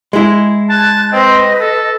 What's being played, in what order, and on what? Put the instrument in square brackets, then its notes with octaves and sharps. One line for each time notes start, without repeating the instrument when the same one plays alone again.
[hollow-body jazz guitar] G#3 E4
[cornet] A5 [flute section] F#6 G#6
[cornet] C4 [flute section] B4 D#5
[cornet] A4